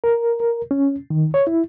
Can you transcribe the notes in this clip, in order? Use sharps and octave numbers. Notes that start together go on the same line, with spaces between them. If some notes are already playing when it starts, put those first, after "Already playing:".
A#4
A#4
C#4
D#3
C#5
E4